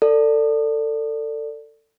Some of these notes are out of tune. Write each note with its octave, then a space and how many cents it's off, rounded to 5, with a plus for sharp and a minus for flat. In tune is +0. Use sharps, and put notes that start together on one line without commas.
A4 +25 D5 +0